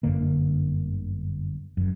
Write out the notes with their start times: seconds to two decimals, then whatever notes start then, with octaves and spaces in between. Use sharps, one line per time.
0.03 G1 F#2 D3 A#3
1.77 F#1 F#2